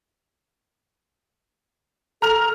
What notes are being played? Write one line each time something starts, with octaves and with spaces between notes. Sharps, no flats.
A4 A#5 F6 F7